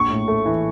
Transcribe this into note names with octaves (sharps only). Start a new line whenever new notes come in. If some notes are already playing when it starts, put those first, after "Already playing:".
Already playing: A#1 C#6
A2
A3
E3